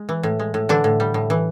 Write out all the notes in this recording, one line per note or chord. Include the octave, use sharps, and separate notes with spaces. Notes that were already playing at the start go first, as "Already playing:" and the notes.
Already playing: G#3
E3
A2
G#3
A2
D3 E3 D4
A2
G3
A2
E3